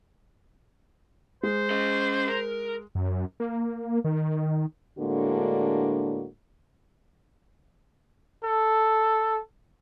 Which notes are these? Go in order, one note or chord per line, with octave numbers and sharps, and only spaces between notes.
G#3 C5
C#4 D#5
A#4
F#2
A#3
D#3
A2 D3 G#3 A#3 D4 F#4
A4